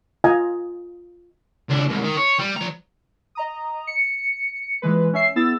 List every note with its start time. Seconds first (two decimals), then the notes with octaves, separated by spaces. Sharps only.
0.24 F4 D#5 F5 G#5 A#5
1.70 C#2 D4
1.88 C2 G#2
2.04 D#3
2.17 C#5
2.39 G3
2.56 F3 A#5
3.35 D#5 A#5 D#6
3.87 C#7
4.82 A#2 E3 G#3 B4
5.13 C#4 E5 C7
5.35 B3 E4 G#4 E6 A6